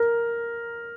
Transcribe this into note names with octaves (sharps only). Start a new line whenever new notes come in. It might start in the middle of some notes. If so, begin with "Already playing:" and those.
Already playing: A#4